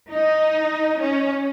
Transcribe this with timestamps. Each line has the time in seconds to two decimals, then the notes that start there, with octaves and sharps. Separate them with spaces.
0.11 D#4
0.99 C#4